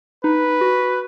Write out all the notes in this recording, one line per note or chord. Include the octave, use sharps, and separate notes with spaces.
D#4 B4
F#4